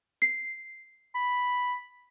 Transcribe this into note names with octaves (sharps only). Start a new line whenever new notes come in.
C7
B5